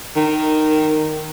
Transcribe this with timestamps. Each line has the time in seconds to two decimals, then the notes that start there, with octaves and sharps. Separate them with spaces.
0.16 D#3